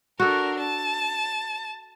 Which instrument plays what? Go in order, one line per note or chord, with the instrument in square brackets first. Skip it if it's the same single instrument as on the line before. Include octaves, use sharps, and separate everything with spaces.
[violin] D4 A#4 [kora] F#4 A4
[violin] A5